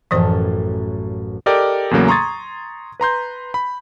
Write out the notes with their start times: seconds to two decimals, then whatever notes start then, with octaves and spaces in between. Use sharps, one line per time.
0.11 A1 F#2 A2 E3 F3 C5
1.46 G4 A4 A#4 D5 D#5 G5
1.91 E2 A2 C#3 F#3 A#3
2.08 A#5 C6 C#6 D#6 G#6 A6
3.00 B4 A#5 C6 G6
3.54 B5